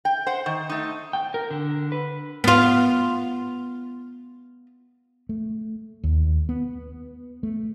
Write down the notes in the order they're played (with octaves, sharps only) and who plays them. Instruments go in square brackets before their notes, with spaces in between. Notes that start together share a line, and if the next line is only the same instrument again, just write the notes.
[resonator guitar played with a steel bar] G5
C5 F#5
D#3
A3 D#4
[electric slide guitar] G5
A#4
D3
B4
[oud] B3 F4
[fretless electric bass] A3
D#2
B3
A3